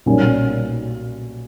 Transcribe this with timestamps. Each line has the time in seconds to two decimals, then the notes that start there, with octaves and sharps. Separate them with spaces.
0.06 B1 A#2 G3 A#3 C#4